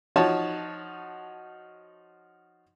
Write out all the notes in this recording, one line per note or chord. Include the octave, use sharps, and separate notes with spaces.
F3 D#4 F#4 C#5 A5